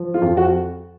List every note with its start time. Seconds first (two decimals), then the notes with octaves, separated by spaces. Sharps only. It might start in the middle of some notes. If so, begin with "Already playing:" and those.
Already playing: F3
0.14 F4
0.22 F2
0.37 F#4